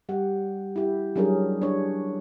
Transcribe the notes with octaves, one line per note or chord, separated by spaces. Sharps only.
G3 G4 F#5
E4 G4
F#3 G3 C#4 D4 G#4 A#4
D4 C#5